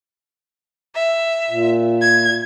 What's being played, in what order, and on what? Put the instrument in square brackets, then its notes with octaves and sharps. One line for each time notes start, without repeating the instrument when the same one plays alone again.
[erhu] E5
[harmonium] A#2
[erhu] G#6